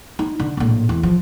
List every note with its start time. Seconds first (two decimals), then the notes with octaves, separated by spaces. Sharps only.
0.19 D#4
0.40 D3
0.57 A#1 A2
0.89 E2
1.03 F3